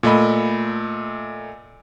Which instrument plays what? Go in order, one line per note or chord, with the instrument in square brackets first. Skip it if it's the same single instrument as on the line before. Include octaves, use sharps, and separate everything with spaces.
[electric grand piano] A#2 A3 D#5 B5